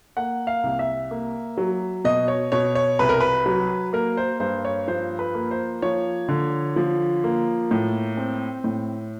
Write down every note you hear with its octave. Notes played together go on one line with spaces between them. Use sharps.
A#3 F#5
F5
C2
E5
A#3
F#3
B2 D#5
C#5
B2 C#5
C#5
C2 B4
A#4
B4
F#3
A#3 A#4
C5
G2 C5
C#5
F3 C5
B4
A#3
C5
F3 C#5
D3
F3
A#3
A2
C4
A2